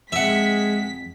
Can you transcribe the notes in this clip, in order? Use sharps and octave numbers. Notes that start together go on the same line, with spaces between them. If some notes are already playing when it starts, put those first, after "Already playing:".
F2 G#3 E5 F#5 B6